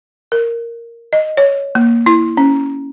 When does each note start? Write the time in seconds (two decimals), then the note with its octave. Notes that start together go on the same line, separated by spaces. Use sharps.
0.32 A#4
1.13 D#5
1.37 C#5
1.75 A#3
2.06 E4
2.37 C#4